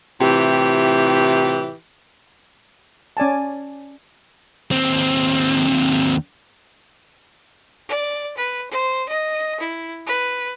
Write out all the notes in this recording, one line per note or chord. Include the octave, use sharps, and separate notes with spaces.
A2 C3 E3 F4 G4
C#4 D5 G#5 A5
D#2 C4
D5
B4
C5
D#5
E4
B4